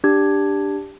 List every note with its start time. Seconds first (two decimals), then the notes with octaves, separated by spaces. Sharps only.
0.04 D4 G4 G#6